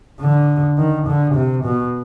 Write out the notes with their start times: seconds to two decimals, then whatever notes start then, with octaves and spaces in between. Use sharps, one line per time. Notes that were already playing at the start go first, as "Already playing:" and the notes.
0.21 D3
0.78 D#3
1.07 D3
1.35 C3
1.64 B2